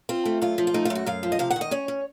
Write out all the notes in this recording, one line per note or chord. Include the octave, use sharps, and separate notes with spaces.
C4 F4
A3
F#2 F4
F3
F4
A3 D#4
F4
F#2
F#4
F#2 F5
F3
D#5
C3 F5
F#5
D#3
D#5
C#4 C#5
C#4